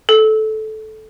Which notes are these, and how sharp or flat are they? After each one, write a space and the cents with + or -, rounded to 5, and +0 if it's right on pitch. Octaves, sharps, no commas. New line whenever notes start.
A4 -15